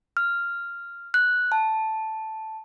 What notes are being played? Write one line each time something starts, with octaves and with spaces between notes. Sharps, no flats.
F6
F#6
A5